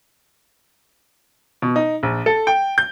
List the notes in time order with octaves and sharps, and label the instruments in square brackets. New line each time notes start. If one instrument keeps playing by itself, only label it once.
[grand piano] B2
D#4
A#1
A4
G5
G6